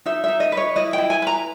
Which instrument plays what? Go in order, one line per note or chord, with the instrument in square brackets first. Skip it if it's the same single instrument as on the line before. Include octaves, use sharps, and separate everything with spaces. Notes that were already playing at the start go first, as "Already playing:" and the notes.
[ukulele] D#4 E5
D#4 E5
D#5
B4
C#5
E4 D#5
E4 G5
G#5
B4 A#5